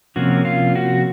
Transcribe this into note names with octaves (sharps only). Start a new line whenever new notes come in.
C3 F3 A#3 C#4 F#4
F4
F#4